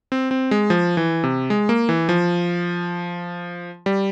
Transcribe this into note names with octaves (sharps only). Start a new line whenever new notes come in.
C4
C4
G#3
F3
E3
C3
G#3
A#3
E3
F3
G3